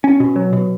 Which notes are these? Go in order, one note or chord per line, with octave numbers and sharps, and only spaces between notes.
C#4
B2
F#3
B2